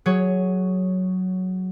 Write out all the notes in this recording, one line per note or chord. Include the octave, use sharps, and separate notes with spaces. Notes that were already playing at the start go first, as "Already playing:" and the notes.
F#3 G#4 C#5